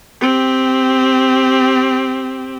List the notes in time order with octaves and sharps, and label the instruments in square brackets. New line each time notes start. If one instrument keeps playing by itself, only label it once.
[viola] C4 G4